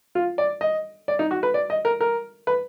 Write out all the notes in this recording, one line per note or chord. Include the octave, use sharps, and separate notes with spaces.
F4
D5
D#5
D5
D#4
F#4
B4
D5
D#5
A#4
A#4
B4